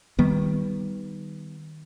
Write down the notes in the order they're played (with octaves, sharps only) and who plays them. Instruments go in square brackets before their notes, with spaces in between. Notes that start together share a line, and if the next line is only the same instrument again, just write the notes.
[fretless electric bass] D#3 G3 B3